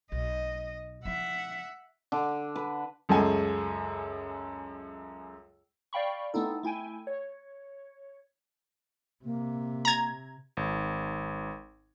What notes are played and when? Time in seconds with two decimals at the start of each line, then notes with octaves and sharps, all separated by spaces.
0.12 B1 D#5
1.05 F3 E4 E5 F#5
2.12 D3
2.56 B4
3.09 C#2 F#2 G#3 A3 A4 G#5
5.93 D5 F5 G5 B5 C#6
6.34 A3 B3 C4 D#4 E4 A4
6.63 A3 E4 G5 G#5
7.07 C#5
9.25 C3 A#3
9.85 A#5 G#6
10.57 G#1